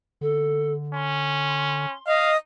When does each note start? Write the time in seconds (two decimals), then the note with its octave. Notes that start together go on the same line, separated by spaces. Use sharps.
0.21 D3 A4
0.94 C#4 C6
2.07 D#5 F5